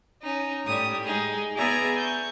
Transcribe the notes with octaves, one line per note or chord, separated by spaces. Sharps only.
C#4 D#4
A2 G3 D#6
G#3 D#4 G#4
B3 G#4 D5 E5 G#5 A#5
C#6 G6